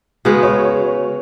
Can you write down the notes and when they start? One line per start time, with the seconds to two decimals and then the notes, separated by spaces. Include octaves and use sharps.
0.25 C#3 G#3 B3 F#4
0.43 C#5